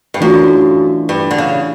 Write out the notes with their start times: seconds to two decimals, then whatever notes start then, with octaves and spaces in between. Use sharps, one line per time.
0.14 G2
0.21 F#2 E3 A3 D4 F4
1.09 G2
1.31 D3
1.38 C#3